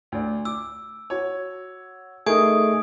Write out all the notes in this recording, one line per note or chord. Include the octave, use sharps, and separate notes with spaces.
D2 D5
D6 E6
F#4 C#5
A3 D#4 G#4 A#4 D#6 G#6 D7